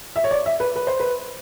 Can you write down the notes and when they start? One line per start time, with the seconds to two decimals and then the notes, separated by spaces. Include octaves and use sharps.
0.16 E5
0.24 C#5
0.31 D5
0.46 E5
0.60 B4
0.76 B4
0.87 C5
1.00 B4